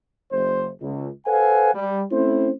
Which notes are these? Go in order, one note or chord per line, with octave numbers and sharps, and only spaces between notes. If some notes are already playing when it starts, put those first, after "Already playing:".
F#1 C5
C#2
A4 B4 C5 F5 F#5 G#5
G3
A3 C4 C#4 E4 C5